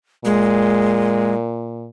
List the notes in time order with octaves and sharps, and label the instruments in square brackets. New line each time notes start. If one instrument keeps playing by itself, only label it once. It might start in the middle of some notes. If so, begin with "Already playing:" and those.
[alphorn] A#2 [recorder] G#3